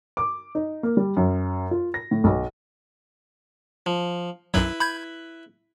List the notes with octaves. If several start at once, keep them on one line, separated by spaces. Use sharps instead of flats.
D6
D#4
A#3
G3
F#2
F4
A#6
A2
B1
F3
B1 F#2 F#3 E4 B4
B5 G6 G#6